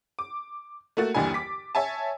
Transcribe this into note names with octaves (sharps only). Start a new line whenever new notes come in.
D6
A3 A#3 F#4 A6
G1 D#2 E3 D4 G#5
D6 B6
C#5 E5 G#5 A5